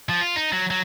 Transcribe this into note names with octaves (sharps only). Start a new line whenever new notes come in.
F3
F4
D#4
F#3
F#3